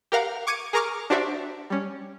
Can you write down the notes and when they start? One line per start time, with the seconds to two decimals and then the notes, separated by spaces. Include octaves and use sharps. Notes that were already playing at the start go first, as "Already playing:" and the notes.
0.12 G4 A#4 F5 F#5 A#5
0.47 C#6 D6 G#6 C#7 D#7
0.73 G#4 A#4 A#5 C#6 D6 F6
1.10 D4 F#4 G4 C5 D5 E5
1.70 G3 C#4